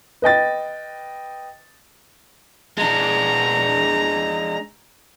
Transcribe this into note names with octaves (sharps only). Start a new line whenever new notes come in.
B4 D#5 G5 A6
G#3 D4 A#5